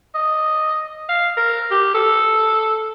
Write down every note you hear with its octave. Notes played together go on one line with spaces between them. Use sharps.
D#5
F5
A#4
G4
A4